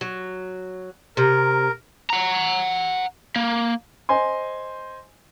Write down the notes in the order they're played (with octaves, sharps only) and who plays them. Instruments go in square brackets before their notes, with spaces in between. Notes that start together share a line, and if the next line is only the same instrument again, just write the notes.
[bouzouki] F#3
[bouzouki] C3 [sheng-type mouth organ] A#4
[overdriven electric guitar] F#5 A#5
A#3
[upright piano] C5 D#5 G#5 C6